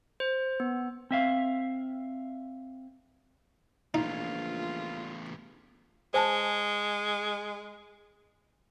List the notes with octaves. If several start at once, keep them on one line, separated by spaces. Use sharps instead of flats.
C5
B3
C4 E5 F5
A#1 E2 A2 D#4 F4
G#3 C5 G#5 A5